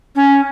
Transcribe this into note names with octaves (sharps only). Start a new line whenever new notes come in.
C#4